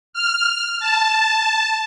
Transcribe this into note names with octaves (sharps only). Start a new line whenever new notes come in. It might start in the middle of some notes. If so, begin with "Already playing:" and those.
F6
A5